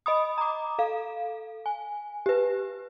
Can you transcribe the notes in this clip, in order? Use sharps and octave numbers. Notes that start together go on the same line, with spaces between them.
D#5 B5 D#6
A#5 D6
A4 F5
G#5
G4 B4